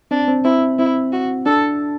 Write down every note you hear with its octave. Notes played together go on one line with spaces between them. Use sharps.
C4 D4
C4
C4 E4
C4 E4
F#4
D4 A4